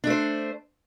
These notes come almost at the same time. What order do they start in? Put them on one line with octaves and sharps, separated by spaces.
D4 A3 C5